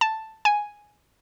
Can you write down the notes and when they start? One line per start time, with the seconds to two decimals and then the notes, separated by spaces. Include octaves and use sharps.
0.01 A5
0.45 G#5